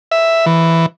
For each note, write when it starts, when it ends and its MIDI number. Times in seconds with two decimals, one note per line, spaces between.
0.12 0.46 76
0.46 0.86 52